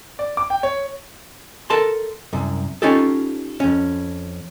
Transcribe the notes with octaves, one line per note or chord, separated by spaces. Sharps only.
D5
D6
G5
C#5
A4 A#4 A5 C6
C2 F#2
C#4 D#4 F4 G4 A4
F2 C#4